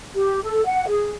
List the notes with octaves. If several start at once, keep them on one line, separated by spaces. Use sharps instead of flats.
G4
A4
F#5
G#4